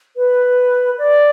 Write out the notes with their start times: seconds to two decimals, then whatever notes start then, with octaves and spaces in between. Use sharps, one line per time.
0.17 B4
0.99 D5